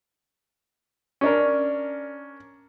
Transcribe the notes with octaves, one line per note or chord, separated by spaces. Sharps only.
C#4 D4 A#4